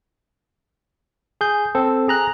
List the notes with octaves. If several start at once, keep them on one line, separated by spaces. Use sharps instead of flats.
G#4 G6
C4 A4
G#4 A#5 F#6